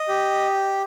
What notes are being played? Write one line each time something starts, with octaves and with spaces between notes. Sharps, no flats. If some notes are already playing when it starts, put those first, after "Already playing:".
Already playing: D#5
G4